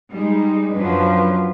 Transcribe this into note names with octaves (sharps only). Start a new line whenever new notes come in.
G3 G#3 D#4
F#2 F3 F#3 D4 B4